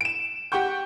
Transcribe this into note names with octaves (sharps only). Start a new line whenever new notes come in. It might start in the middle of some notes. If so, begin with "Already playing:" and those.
D7 E7
G4 F#5 G5 C#6 G6